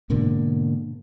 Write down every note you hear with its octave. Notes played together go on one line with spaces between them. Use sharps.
G#2 B2 D3 A#3